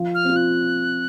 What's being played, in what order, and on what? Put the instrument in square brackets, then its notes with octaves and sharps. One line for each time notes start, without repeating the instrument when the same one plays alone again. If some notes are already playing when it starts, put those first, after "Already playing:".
Already playing: [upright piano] F3
[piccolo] F6
[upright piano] C4 F4
[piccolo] F#6